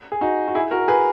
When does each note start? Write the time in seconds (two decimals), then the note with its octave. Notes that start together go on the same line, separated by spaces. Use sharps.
0.12 G#4
0.21 D#4 F#4
0.48 F#4
0.55 E4 G#4
0.71 F#4 A#4
0.88 G#4 B4